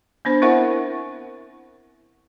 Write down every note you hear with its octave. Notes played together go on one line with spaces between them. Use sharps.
B3 D4 C5
C4 E4 A#4 C5 E5 F#5